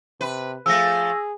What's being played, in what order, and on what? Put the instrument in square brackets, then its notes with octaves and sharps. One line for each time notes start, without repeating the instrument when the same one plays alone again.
[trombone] C3 [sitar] B4
[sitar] F3 A3 [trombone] G#4 [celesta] E6 A#6